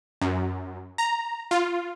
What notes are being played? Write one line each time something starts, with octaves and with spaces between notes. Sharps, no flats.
F#2
A#5
F4